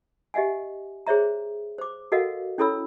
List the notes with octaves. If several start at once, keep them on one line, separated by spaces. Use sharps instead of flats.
G4 D#5 E5 F#5 G#5
G#4 C5 C#5 E5 A#5
C5 D6
F#4 A4 A#4 D#5 F5 F#5
C#4 E4 A4 C#5 B5 E6